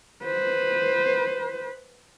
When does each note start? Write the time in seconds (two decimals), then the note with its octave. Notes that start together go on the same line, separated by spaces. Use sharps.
0.24 B4 C5